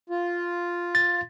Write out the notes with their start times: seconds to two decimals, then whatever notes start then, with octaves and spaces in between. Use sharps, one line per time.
0.10 F4
0.95 A6